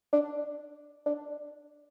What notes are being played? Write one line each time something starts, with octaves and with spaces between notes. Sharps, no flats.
D4
D4